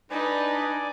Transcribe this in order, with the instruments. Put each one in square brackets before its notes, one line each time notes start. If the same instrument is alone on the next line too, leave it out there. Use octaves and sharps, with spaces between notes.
[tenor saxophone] D4 [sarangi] D#4 [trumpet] B4 [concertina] D5 G#5 D6